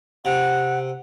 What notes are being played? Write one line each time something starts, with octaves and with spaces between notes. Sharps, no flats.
C3 F#5